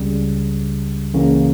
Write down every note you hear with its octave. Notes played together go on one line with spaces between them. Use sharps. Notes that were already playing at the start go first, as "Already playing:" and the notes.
Already playing: C#2 C#3 G3
C#2 C#3 E3 A#3 C#4